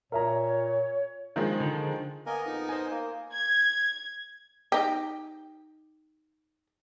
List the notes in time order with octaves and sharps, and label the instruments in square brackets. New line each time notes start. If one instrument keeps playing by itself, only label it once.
[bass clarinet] A#2 [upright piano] A#4 E5 A#5 [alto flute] C#5
[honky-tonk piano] D#3 F3 G#3
[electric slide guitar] D3
[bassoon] A#3 [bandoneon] B3 A#4 D#5 [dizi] G#5
[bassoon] F2 [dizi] D#4
[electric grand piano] C5 G#5
[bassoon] A#3
[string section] G#6
[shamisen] D#4 G4